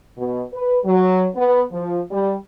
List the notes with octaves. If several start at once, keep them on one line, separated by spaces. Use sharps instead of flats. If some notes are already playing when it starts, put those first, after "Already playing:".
B2
B4
F#3
B3
F3
G3